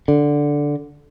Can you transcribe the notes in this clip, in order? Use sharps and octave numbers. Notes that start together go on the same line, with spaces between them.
D3